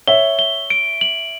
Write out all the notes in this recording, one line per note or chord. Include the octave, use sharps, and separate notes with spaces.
C#5 E5 G7
G7
D7
F#7